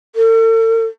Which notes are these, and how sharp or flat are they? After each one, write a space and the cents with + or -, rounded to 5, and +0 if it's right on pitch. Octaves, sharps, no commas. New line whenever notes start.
A4 +45